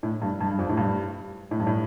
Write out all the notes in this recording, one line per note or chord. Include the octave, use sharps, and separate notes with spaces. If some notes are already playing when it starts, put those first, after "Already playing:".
A2
G2
G2
G2
F2
A2
G2
A2
G2
A2